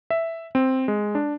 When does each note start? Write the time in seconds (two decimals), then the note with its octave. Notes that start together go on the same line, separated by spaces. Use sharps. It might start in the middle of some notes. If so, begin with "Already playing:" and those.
0.10 E5
0.55 C4
0.88 G#3
1.15 D4